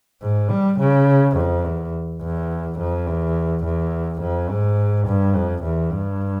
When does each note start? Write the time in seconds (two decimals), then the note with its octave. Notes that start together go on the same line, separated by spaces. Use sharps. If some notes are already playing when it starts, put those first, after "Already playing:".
0.22 G#2
0.50 G3
0.79 C#3
1.36 F2
1.64 E2
2.22 E2
2.78 F2
3.07 E2
3.64 E2
4.21 F2
4.50 G#2
5.07 G2
5.36 F2
5.64 E2
5.92 G2